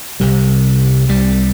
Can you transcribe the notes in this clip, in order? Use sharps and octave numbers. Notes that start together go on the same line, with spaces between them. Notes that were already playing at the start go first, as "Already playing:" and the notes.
C2 C3 G3
C2 C3 G3